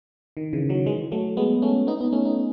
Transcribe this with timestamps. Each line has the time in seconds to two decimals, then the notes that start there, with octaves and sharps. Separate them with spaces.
0.37 D#3
0.53 C#3 E3
0.69 D#3 F#3
0.86 E3 G#3
1.12 F#3 A3
1.37 G#3 B3
1.62 A3 C#4
1.87 B3 D#4
2.01 B3 D#4
2.13 A3 C#4
2.25 B3 D#4